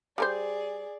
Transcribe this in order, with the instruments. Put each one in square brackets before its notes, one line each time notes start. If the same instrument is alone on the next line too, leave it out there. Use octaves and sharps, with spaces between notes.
[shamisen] G3 A#4 C5 [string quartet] G#4 D5